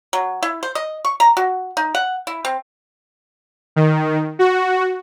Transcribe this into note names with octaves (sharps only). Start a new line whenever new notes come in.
F#3
E4
C5
D#5
C#6
A#5
F#4
D#4
F#5
E4
C4
D#3
F#4